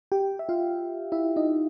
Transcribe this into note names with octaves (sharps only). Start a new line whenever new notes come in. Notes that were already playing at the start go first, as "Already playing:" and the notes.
G4 G5
E5
F4 F5
E4 E5
D#4 D#5